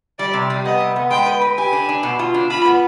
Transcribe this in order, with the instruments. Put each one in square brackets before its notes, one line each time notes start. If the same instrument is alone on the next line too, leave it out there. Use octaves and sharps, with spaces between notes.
[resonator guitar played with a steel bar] G3 [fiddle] D5
[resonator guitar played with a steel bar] C3
G3
[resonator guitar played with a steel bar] B3 [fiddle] D#5
[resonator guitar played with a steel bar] C3
B3
[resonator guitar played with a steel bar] G#3 [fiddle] G5
[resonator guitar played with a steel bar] B4
B4
[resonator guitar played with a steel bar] G4 [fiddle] G#5
[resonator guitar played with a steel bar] D4
D4
B2
F4
D4
[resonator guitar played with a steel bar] F4 [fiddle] B5
[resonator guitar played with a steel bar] B3